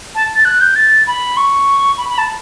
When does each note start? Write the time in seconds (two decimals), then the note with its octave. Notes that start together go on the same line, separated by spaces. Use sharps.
0.15 A5
0.35 A6
0.45 F#6
0.61 G6
0.76 A6
1.07 B5
1.37 C#6
1.98 B5
2.09 B5
2.18 A5